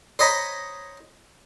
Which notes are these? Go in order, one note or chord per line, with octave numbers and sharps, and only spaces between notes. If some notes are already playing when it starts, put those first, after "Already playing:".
C5 C#5 D#5 A#5 B5